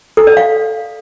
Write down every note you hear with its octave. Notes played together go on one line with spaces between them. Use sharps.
A4
D5
F5